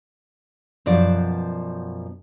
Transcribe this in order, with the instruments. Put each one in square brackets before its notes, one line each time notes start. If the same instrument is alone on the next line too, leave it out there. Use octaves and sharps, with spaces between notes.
[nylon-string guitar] F#2 B2 F3 D5